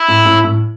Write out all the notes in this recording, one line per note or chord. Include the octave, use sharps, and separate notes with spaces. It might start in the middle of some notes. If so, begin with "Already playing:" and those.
Already playing: E4
A2
A2
A2